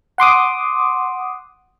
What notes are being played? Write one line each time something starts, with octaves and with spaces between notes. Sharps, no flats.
F#5 C6 D6 D#6